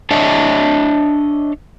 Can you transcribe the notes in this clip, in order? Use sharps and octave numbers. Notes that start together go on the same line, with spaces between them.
D4 C#5 D#5 E5 A5